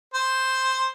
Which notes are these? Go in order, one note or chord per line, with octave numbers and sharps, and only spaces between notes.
C5